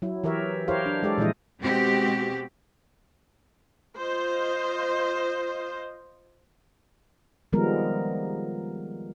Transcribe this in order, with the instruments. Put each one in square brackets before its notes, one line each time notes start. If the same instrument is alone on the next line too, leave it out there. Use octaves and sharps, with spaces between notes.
[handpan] F#3 E4
E3 G4 A#4 C#5 E5
E4 G4 A#4 C5 C#5 F5
D4
G#3 G4 A4 D5
A#2 E3 F3 G#3 E4 D#5
[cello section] B2 G#3 C4 F#4 G4
[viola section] F4 C5 D#5
[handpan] D#3 F3 G3 G#3 B3 A#4